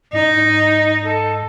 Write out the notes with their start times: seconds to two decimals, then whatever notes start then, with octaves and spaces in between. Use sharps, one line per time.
0.13 G#2 D#4 D#5
1.04 A4